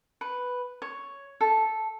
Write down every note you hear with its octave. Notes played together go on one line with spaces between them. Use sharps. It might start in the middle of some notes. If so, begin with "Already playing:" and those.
B4
C#5
A4